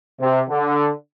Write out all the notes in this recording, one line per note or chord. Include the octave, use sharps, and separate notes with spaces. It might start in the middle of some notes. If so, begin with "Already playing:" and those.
C3
D3